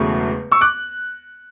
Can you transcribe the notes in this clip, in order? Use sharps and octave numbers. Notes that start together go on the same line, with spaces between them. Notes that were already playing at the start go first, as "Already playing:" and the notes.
Already playing: E1 E2 C#3 F#3 A3 C#6
C#6 E6
D6 F#6